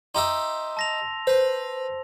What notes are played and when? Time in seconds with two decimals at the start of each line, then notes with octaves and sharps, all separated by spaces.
0.15 D#4 G4 E5 C6 E6
0.77 A5 A#6 F7
1.27 B4 C5